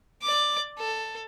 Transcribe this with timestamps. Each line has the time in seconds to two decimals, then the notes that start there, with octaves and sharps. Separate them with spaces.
0.22 D5 D6
0.78 A4